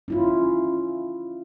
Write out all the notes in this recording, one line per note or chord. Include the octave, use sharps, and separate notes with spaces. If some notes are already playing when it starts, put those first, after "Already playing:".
C#4 E4 F4